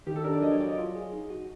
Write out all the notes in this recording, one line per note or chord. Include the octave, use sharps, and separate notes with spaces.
D#3 G4
A4
D4 A#4
D5
F#3 D#5
C#5
F#3 D5
D#5
F4
G#4
D#4
F#4